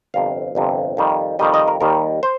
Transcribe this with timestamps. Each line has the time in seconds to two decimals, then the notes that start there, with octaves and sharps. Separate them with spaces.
0.14 G1 F2 C3 F5
0.55 G1 F2 C3
0.97 F2 D#3 G3
1.39 F2 D#3 G3 D#5
1.54 D#5
1.68 A#4
1.81 D#2 D#3 G3 A#4
2.23 C5